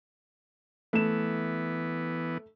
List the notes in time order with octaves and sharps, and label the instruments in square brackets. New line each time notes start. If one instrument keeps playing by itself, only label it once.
[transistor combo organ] E3 B3 [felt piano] A3 E7